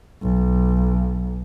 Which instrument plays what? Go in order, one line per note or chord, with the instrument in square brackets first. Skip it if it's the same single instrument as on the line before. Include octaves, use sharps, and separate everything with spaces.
[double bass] B1